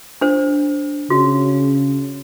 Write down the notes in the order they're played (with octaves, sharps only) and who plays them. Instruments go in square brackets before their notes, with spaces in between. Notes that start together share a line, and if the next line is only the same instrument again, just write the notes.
[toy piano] D4 C5
[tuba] C#3 [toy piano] F#4